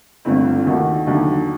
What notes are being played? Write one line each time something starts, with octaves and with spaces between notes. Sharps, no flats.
G1 G2 D3 A3 C4
D#2 D#3 A3 D#4 F#4
D#2 D3 F#3